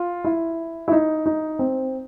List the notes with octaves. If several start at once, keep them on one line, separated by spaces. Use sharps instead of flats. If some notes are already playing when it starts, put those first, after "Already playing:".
Already playing: F4
E4
E4
D#4
D#4
C4